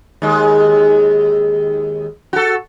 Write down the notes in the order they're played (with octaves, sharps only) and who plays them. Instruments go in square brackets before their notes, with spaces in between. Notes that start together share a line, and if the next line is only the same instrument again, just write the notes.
[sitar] D#2 G#3
F#4 A4